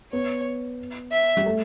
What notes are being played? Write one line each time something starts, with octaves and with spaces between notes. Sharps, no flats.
B3 C#5
E5
G3
A3